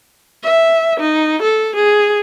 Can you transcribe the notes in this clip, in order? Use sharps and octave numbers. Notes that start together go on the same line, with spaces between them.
E5
D#4
A4
G#4